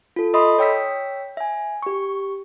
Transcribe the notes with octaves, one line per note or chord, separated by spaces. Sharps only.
F4 A4
A4 D#5 E5 B5 C6 D#6
C#5 G5 E6 B6
E5 G#5
G4 C#6